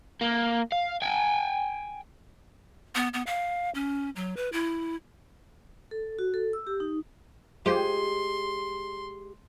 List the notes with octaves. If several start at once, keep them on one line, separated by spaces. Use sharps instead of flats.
A#3
F5
G5 G#5
B3
B3
F5
C#4
F#3
B4
E4
A4
F#4
A4
E6
G4
D#4
G#3 F4 G4 C5 G5 C6